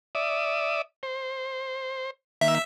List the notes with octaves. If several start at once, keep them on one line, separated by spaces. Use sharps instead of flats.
D5 E5 D#6
C5
D#3 A#3 E5